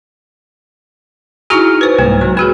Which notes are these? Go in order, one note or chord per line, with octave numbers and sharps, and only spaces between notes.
D#4 E4 F#4 G#4 A#5 F6
B4 C5
C2 G#2 A#3
F#3
A#3 F#4 G#4 B4